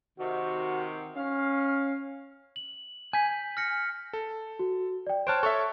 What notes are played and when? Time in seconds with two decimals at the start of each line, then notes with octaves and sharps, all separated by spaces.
0.19 C3 D#3 F#4
1.16 C#4 F5
2.56 F#7
3.13 G#5 G6 B6
3.57 F6 A#6 C#7
4.13 A4
4.59 F#4
5.07 D5 G5
5.27 C5 C#5 A5 F6 F#6 D7
5.43 A4 C#5 E5 C#6